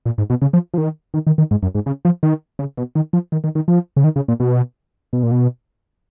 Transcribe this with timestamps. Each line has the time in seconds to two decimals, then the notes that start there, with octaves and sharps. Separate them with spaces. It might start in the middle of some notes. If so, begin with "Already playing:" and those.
0.05 A#2
0.18 G#2
0.30 B2
0.42 C#3
0.53 F3
0.74 F3
0.78 D#3
1.14 D#3
1.27 D#3
1.38 D#3
1.51 G#2
1.63 F#2
1.75 G#2
1.86 C#3
2.05 F3
2.23 D#3
2.59 C#3
2.78 B2
2.95 D#3
3.13 F3
3.32 D#3
3.44 D#3
3.55 D#3
3.68 F3
3.97 C#3
4.04 D#3
4.16 C#3
4.28 A#2
4.40 B2
5.13 B2
5.23 A#2
5.31 B2